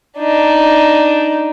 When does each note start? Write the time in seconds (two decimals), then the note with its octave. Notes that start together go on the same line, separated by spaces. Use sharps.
0.18 D4 D#4